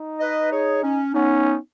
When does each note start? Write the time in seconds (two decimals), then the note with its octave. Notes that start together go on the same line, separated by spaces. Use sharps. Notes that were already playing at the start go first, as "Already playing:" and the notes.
Already playing: D#4
0.20 B4 D#5
0.51 G#4 C#5
0.83 C#4
1.14 B3 C#4 D#4